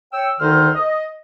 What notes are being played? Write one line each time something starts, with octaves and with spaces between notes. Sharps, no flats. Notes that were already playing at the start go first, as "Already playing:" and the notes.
C#5 G5 E6
D2 D#3 D#4 A4 C5 F6
D#5